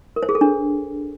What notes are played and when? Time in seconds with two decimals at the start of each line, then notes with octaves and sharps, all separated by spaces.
0.16 A#4
0.23 C5
0.29 G#4
0.35 A4
0.41 D4